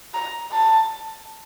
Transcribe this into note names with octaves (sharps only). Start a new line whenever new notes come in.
A#5
A5